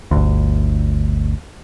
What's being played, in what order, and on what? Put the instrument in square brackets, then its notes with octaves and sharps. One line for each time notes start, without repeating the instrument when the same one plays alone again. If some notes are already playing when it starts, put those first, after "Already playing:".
[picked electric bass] G1 D2